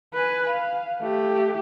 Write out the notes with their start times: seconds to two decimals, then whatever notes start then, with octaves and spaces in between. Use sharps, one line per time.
0.13 B4 G#5
0.50 F5
1.01 A3 G4